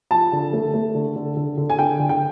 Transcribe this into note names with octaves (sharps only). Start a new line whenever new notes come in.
F3 A5
D3
A3
A3
D3
D3
D3
D3
G#5
D3 G5
D3
G5